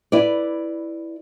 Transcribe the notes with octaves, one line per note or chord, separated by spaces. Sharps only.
E4 B4 D5